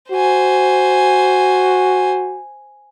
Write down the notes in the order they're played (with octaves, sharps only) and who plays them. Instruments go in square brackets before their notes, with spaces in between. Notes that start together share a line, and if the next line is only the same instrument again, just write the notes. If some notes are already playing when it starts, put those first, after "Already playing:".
[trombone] F#4 [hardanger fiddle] C5 G#5